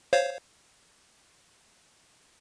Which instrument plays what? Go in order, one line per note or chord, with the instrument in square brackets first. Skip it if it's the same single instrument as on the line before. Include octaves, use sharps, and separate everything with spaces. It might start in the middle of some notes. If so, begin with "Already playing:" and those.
[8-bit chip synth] C5 C#5 F5